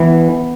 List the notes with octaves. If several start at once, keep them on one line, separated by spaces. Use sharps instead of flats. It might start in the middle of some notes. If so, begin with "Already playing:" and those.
Already playing: E3 B3